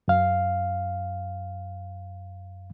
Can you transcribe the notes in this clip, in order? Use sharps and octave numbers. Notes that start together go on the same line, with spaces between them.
F#2 F5